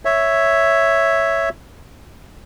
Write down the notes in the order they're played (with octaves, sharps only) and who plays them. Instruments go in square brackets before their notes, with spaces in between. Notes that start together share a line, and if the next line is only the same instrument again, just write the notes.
[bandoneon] C#5 E5